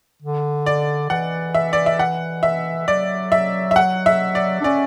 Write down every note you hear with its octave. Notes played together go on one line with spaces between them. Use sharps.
D3
D5
E3 F#5
E5
D5
E5
F#5
E5
F#3 D5
E5
E5
F#5
E5
D5
D4
C#4 D5